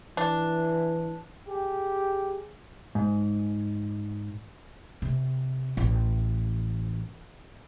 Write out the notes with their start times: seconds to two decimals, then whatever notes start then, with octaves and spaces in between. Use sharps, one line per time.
0.17 E3 D4
1.48 G4 G#4
2.95 G#2
5.02 C3
5.77 A1